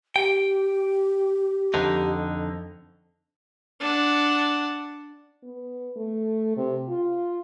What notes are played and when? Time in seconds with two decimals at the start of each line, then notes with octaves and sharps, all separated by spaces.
0.16 G4 G5
1.74 F2 D3 D#4
3.80 D4 F#5
5.43 B3
5.97 A3
6.57 C3
6.89 F4